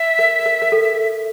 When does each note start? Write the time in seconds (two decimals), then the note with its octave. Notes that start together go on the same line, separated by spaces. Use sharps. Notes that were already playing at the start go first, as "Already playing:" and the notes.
Already playing: E5
0.19 A#4
0.46 A#4
0.62 A#4
0.72 A4